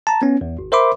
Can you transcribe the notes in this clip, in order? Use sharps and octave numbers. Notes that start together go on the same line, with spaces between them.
A5 A#5
B3 C#4
E2
G#1
A#4 C5 E5 B5 C6 D6